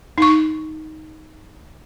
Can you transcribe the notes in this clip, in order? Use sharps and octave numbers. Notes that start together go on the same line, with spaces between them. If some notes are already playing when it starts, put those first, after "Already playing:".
D#4 C#6